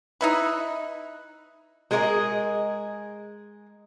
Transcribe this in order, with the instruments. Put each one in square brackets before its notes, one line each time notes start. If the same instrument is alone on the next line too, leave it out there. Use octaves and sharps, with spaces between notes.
[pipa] D#4 E4 B4
[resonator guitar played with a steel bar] G#3 G#4 A#4 C#5 D#5